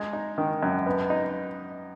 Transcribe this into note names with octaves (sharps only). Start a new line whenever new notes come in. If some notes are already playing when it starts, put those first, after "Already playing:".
Already playing: G#3
D#4
D#3
F#2
B3
D#4